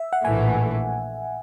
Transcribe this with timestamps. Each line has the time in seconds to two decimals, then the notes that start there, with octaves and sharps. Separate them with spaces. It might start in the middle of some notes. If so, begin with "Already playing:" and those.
Already playing: E5
0.13 F#5
0.24 A#1 A2 E3 A3 G#5